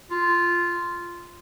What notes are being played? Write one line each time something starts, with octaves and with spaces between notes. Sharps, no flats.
F4